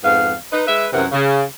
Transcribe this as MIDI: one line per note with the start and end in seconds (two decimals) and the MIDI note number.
0.03 0.33 41
0.03 0.33 44
0.03 0.33 59
0.03 0.33 77
0.52 0.64 63
0.52 0.64 71
0.67 0.87 56
0.67 0.87 71
0.67 0.87 76
0.93 1.06 42
0.93 1.06 48
0.93 1.06 52
0.93 1.06 70
0.93 1.06 78
1.12 1.43 49